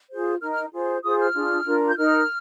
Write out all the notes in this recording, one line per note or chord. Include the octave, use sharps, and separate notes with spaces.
F4 G#4 C5
D#4 A#4 F6
F6
F4 G#4 C5
F4 G#4 C5 D#6
F6
D4 F4 G#4
D4 F4 A#4
G6
D#4 A#4 F6